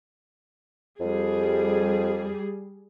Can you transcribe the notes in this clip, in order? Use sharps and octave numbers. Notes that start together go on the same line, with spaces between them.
F2 G3 G#4